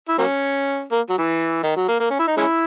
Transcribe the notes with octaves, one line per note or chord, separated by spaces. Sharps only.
E4
F#3 A#3 C#4
A#3
F#3
E3
D#3
F#3
A#3
A#3
C#4
E4
D#4
G#3 C#4 E4